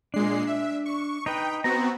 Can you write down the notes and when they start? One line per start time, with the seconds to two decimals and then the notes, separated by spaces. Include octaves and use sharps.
0.14 A#2 G#3 D4 C7
0.47 E5
0.86 C#6
1.26 D#4 B4 G5
1.64 B3 C4 F#4 A#5